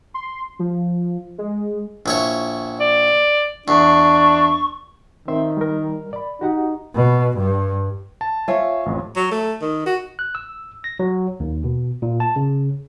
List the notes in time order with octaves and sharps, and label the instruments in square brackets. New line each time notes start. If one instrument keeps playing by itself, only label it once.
[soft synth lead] C6
F3
G#3
[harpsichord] A#1 E4 C#5
[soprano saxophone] D5
[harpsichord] E2 [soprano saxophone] D4 [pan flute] C#6
[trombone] D#3 [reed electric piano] C4 E5 C6
[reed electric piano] G3 A#4
D5 B5
[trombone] D#4 [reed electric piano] F#4 G4 F#5
[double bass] B2
G2
[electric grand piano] A5
[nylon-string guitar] F4 C#5 [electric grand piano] C5 E5 G#5
[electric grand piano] A1 F2
[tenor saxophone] F#3
A3
D#3
F#4
[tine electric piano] F#6
E6
A#6
F#3
D#2
B2
A#2
A5
C#3